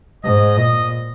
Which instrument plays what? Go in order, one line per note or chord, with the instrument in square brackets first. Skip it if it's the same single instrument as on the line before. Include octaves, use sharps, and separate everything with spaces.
[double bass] G#2 [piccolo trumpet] D#5
[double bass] A#2 [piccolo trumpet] D#5